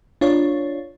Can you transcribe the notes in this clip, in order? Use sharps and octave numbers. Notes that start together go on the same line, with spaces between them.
D4 F4 C#5